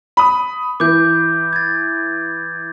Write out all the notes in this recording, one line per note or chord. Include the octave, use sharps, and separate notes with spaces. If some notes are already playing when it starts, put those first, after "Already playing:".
B5 D#6
E3 D6 G6
G#6 A6